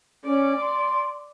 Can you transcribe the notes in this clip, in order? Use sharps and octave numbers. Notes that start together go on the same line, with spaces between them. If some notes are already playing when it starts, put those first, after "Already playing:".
C#4 D5
C6